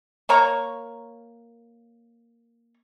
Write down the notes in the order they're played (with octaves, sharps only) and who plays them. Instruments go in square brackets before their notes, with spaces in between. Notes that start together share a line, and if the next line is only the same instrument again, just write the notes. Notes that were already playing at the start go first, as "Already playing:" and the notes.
[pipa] A#3 C#5 A#5 C#6